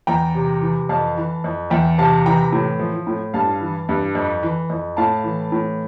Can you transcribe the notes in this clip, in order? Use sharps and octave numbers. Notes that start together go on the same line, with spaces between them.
E2 G5 A#5
C3
E3
F2 F5 A5
E3
F2
E2 E5 G5
C3 F5 A5
E3 G5 A#5
A2
F3
A2
G2 F5 A5
E3
G2
F2
E3
F2
A2 F5 A5
E3
A2